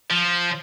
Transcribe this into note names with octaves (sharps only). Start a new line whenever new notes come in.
F3